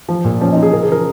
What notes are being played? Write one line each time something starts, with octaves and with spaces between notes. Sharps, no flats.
F3
A#2
F3 C#4
D#4
F3
G#4
C#3 A#4
G#4
F3 A#4